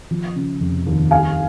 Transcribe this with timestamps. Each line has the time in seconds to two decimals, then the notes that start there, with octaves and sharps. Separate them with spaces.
0.11 F3
0.36 C#3
0.61 F1
0.86 D#2
1.11 G3 F5 G#5